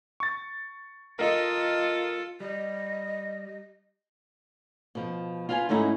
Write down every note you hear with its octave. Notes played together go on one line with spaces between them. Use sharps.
C#6 A6
F4 A4 A#4 D#5
G3 D#5
B2 F3
F4 B4 F5 F#5 G#5
G#2 A3 C#4 D#4 E4